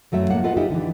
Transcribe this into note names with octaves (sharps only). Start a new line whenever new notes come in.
F#2 F#3 A3 E5
A2 A#3 F#5
F4 A4 B4 D#5 F#5
D#4 F4 G4 E5
D3 E3